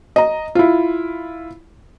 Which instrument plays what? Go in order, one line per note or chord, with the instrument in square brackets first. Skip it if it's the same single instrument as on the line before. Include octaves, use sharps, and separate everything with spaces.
[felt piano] D#5 A#5
E4 F4